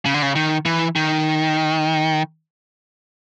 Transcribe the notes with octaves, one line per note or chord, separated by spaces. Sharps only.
C#3
D3
C#3
D#3
E3
D#3